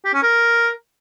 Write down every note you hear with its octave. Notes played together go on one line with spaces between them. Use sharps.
G4
C#4
A#4